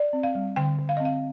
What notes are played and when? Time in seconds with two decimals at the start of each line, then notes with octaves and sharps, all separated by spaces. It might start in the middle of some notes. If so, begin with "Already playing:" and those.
Already playing: D5
0.13 C4
0.23 F5
0.35 G3
0.56 D3 G5
0.78 D3
0.89 F5
0.97 D#5
1.00 C4
1.05 F5